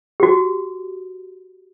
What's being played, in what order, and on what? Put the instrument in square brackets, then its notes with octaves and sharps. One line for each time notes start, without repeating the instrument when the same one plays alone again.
[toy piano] F#4 G4